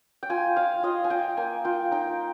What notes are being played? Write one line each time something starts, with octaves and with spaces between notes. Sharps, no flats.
G5
F4 G#5
F4 F5
F4 D#5
G#5
F4 G5
A#3 G#5
F4 G5
D#4 G5